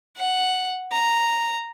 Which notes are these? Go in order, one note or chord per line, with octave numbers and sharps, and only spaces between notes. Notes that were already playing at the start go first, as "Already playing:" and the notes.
F#5
A#5